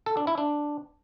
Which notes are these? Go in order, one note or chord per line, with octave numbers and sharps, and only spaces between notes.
A4
D4
E4
D4